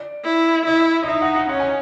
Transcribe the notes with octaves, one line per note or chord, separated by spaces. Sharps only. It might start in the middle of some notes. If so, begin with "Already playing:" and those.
Already playing: D5
E4
E4 D#5
D#5
D#4 E5
F#5
F#5
C#4 F#5
G#5